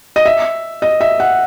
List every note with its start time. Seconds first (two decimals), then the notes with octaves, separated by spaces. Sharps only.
0.16 D#5
0.26 E5
0.82 D#5
1.01 E5
1.20 F#5